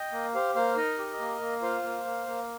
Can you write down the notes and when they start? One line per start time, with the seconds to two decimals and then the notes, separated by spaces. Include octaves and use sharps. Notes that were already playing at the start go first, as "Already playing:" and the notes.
Already playing: D#5 G5
0.12 A#3
0.34 G4 C5 F5
0.55 A#3 C5 F5
0.76 D#4 A#4 D#5
0.98 G4
1.20 A#3
1.40 A#3
1.62 F4 C5 F5
1.83 A#3
2.05 A#3
2.27 A#3